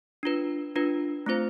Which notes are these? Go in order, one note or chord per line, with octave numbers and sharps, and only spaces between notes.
D4 F4 B4
D4 F4 B4
A3 C4 F4 C5